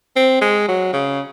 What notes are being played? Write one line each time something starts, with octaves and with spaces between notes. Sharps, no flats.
C4
G#3
F#3
C#3